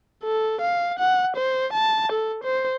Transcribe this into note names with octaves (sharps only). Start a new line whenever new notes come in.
A4
F5
F#5
C5
A5
A4
C5